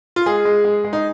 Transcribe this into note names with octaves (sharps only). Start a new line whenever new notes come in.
F4
G#3 G#4
G#3
G#3
G#3
D#4